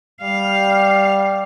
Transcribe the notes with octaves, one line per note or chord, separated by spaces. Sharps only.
G3 F5